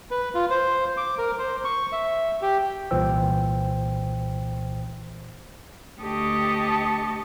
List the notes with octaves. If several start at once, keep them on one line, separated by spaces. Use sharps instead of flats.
B4
F4
C5
D6
A#4
C5
C#6
E5
G4
C2 A#2 E3 C5 G5 E6
D2 G4 D#5 A5 C#6